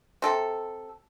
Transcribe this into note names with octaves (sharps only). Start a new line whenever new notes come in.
C3 A4